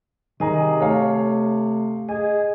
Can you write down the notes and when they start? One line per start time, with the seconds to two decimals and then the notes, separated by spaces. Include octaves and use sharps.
0.40 C3 D#3 G#4 D#5 A#5
0.81 A3 A4 C#5 F5
2.09 G#4 D#5 G#5